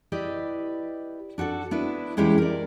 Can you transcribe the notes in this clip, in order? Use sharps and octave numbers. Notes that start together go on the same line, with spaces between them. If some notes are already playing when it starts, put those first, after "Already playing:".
E4 G4 B4 D5 D#5
D4 F#4 G4 A4
B3 D4 E4 B4
E2 G#3 C#4 E4 G4 G5
A#4 D5